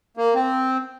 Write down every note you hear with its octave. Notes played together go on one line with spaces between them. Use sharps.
A#3
C4